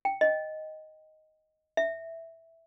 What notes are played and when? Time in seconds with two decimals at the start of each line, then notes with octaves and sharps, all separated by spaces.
0.05 G5
0.21 D#5
1.77 E5